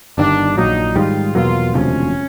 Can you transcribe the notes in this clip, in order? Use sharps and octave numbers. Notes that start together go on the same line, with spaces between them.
G1 G2 D#3 D4
A#1 A#2 F#3 D#4
G#2 D#3 G3 F4
E2 B2 F#3 A#3 F4
E1 D2 C3 F3 C#4